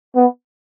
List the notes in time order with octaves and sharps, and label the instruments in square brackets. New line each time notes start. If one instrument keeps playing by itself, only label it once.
[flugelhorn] B3